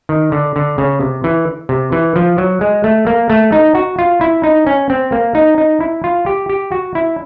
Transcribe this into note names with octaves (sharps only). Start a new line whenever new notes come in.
D#3
D3
D3
C#3
C3
E3
C3
E3
F3
F#3
G#3
A3
A#3
A3
D#4
F#4
F4
E4
D#4
C#4
C4
A#3
D#4
D#4
E4
F4
G4
G4
F#4
E4